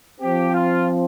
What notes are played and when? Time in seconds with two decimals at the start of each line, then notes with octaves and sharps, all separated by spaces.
0.20 F3 C4 G4
0.53 F4